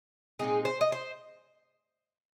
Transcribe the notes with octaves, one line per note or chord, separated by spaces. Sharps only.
A#2 G#3 C4 D#4 G#4
C5
D#5
C5